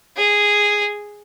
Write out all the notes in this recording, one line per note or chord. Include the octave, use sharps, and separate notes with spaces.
G#4